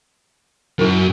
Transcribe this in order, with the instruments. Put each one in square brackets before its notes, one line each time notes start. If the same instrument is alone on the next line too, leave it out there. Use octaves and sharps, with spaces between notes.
[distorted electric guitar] F#2 [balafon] E4 A#4